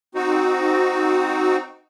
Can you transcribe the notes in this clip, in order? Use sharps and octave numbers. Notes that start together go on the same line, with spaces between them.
C4 D#4 F#4